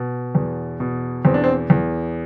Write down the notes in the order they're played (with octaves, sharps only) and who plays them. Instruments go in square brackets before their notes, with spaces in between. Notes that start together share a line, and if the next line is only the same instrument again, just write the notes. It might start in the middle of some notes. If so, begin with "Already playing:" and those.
Already playing: [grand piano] B2
E2
B2
E2 C4
D4
C4
E2